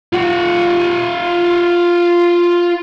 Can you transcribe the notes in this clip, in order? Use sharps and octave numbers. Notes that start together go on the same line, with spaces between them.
F4 F#5